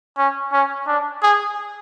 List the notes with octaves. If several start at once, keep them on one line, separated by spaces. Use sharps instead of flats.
C#4
C#4
D4
G#4